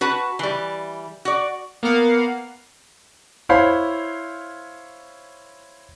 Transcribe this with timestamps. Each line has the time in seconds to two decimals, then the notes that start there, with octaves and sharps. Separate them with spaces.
0.01 F#4 B4 A5
0.39 E3 G3
1.25 F#4 D5
1.83 A#3 B3 A#4 F5 F#5
3.49 E4 C5 C#5 F5 B5